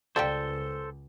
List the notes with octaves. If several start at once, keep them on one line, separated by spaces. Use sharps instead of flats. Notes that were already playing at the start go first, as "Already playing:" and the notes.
C#2 G3 F4 G4 A4 C5